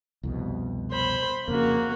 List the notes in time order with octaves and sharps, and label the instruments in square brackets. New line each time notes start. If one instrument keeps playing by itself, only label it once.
[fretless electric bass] C2 F2 B2
[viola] C5 B5
[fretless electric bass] F2 C#3 [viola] A#3 F#4